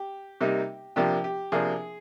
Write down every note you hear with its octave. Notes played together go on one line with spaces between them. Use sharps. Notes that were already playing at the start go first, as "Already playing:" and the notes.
Already playing: G4
C3 G3 A#3 D#4
C3 F3 A#3 D4 G4
G4
C3 F3 A#3 D4 G#4